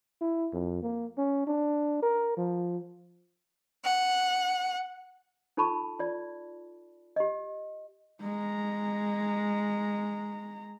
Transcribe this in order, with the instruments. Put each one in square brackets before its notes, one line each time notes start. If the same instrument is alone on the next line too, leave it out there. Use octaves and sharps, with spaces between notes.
[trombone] E4
F2
A#3
C#4
D4
A#4
F3
[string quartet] F#5
[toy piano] D#4 F4 A4 A5 B5 C#6
F4 D5
G4 D#5
[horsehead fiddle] G#3 A#5